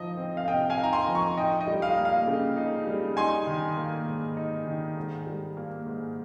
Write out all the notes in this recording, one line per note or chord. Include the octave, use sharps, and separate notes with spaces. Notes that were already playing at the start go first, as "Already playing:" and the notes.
Already playing: F3 D#4 D#5
C4
F5
C3 D#5 G5
F5 G#5
D#4
A#5
G#5 C6
F3
A#5 C#6
D#4 D#5 G5
D#5
G3
F5
A#3
F5
C#3
D#4
G3
D#4 G#5 C6
D#3
A#3
G#2
D#4
D#3
G#2
G3
A#3
G#2